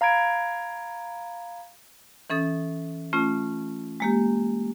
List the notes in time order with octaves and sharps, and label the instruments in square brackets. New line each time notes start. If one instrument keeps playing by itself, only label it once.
[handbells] F5 A#5 B5 G#6 D7
[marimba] E3 C#4 A4 D#6
A3 C#4 F4
G#3 A#3 G4